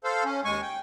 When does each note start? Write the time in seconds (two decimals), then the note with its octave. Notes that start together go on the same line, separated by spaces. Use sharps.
0.04 A4 C5 F5
0.24 C#4
0.44 D#2 G#3 G#5 C#6
0.62 G5